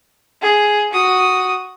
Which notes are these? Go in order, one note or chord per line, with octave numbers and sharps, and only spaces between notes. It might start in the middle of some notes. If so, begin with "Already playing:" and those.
G#4
F#4 D#6